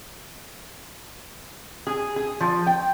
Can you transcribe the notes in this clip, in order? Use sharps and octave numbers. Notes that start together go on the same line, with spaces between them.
G#4
G#4
F3
G5